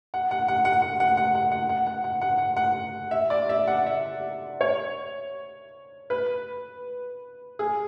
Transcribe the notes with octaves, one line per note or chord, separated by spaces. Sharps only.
F#5
F#5
F#5
F#5
F#5
F#5
F#5
F#5
F#5
F#5
F#5
F#5
F#5
F#5
F#5
E5
D5
E5
F#5
E5
C#5
B4
G#4